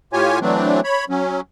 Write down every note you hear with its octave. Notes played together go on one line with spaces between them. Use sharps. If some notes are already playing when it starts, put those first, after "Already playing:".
A2 F4 G4 C#5 G#5
E3 F#3 A3 C4 D4
C#5 B5
F#3 C#4